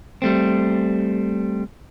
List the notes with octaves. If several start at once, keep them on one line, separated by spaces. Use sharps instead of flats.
G3 A3 C4